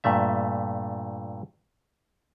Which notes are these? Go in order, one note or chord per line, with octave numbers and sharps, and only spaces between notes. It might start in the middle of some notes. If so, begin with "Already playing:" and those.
G2 A#2 A3 E5